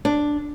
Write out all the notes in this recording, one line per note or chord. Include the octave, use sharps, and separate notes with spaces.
D4